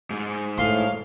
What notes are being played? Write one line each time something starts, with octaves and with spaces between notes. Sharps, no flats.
G#2 G#3
A2 F5 C6